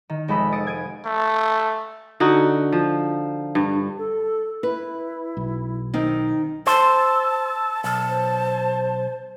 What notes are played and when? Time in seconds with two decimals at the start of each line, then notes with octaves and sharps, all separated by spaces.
0.10 D#3
0.28 F1 G#3 A4 B5 D#6 E6
0.52 D#6 A6 C#7 D7
0.67 G#6 D7 D#7
1.05 A3
2.20 D3 D#4 F#4
2.72 F3
3.55 G2
3.98 A4
4.63 E4 B4
5.37 B1
5.94 D#3 C4 D#4
6.67 C5 A5 E6
7.84 B1 A5
8.09 C5